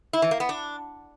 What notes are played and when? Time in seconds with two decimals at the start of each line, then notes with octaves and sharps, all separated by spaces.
0.13 E4
0.22 E3
0.31 A#3
0.40 B3
0.49 D4